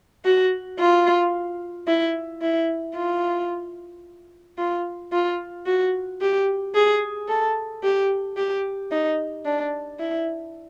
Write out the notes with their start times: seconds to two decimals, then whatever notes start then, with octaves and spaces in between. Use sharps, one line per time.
0.25 F#4
0.79 F4
1.87 E4
2.42 E4
2.96 F4
4.58 F4
5.12 F4
5.67 F#4
6.21 G4
6.75 G#4
7.29 A4
7.83 G4
8.37 G4
8.92 D#4
9.45 D4
10.00 E4